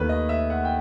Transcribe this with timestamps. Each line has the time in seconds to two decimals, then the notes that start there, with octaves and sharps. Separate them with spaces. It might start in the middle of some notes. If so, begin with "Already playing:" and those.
Already playing: D#2 D#3 A3 B4
0.09 D#5
0.29 E5
0.50 F#5
0.65 G5